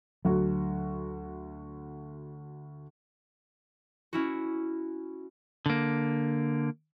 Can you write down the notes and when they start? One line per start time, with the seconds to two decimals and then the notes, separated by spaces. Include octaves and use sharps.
0.25 D2 F#3 F#4
4.13 C#4 E4 F#4
5.66 D3 A#3